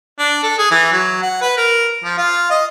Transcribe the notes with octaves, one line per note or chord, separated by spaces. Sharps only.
D4
A4
G#4
E3
F#3
F#5
B4
A#4
F3
F4
D#5